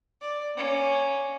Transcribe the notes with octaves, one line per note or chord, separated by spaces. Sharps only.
D5
A#3 C#4